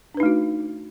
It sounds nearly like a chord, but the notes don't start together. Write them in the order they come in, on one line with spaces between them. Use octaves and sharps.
D4 B4 D#4 A3 F#4